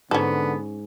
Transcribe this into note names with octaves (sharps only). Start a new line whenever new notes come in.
G#2 D3 B3 C#4 A4